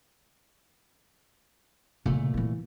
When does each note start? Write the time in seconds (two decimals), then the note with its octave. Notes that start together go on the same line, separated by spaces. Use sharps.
2.05 A#2 C#3 E3 A3
2.34 E3 E4